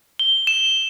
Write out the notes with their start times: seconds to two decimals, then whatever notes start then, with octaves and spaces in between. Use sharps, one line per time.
0.19 G7
0.47 E7